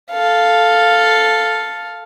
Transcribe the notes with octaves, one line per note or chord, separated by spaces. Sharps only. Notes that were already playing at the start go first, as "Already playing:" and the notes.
A4 F5